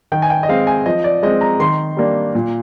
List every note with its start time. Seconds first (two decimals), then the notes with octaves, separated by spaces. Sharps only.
0.12 D#3 G5
0.22 G#5
0.30 G5
0.43 D#5
0.49 G#3 C4 F5
0.67 G#5
0.86 F3 D#5
1.04 D5
1.23 G#3 C4 D#5
1.41 A#5
1.60 D#3 C6
1.97 G3 A#3 D4
2.35 A#2